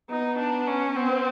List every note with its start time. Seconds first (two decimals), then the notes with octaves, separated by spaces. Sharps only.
0.10 B3 D#4
0.39 D4
0.67 C#4
0.96 B3 C4